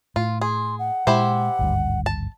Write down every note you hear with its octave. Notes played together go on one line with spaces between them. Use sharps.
A2 F4
G#4 C6
F#5
A#2 G#3 E4 G4 C5
G#1 D2 G2
A5